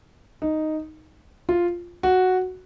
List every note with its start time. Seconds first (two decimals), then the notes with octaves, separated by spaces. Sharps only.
0.42 D#4
1.49 F4
2.03 F#4